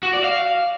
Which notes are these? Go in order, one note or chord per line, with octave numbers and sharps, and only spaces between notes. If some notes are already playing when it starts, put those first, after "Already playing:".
F#4
D5
F5